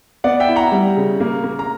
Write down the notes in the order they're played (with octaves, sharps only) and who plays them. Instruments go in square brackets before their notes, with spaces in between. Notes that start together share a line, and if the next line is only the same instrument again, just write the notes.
[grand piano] B3 D5 F#5
E5 G5
E4
F#5 A#5
G3
C#3
A#3
A#3
A#5